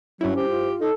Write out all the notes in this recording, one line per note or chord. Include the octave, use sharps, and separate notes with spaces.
G2 F#3 C#4 E4
G4 C5
F4
D#4 A4